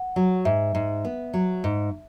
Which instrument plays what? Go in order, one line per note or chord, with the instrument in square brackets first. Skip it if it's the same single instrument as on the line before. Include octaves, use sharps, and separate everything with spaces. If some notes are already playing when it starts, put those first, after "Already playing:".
Already playing: [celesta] F#5
[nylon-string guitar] F#3
[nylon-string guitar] G#2 [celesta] E5
[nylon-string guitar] G#2
B3
F#3
G#2